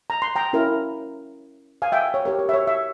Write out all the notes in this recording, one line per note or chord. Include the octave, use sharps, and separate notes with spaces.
A#5
C6
G5 A#5
C#4 E4 A#4
F5 G#5
E5 G5
C#5
G4 A#4 C#5
C#5
E5
C#5
E5